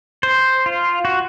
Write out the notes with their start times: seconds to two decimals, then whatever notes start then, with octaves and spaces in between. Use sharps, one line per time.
0.23 C5
0.66 F4
1.05 F#4